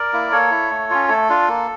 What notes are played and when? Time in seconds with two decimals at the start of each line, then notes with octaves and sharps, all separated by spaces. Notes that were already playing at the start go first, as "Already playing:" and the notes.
Already playing: A#4 D5
0.13 A#3 E4
0.32 A#3 A4 C#5
0.51 E4
0.71 A3
0.90 C#4 F4
1.09 A3 A4
1.29 D4 F4
1.48 A#3